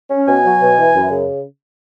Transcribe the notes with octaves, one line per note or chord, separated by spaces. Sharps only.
C#4
B2 G#5
F#3
B2
E3
F#2
C#3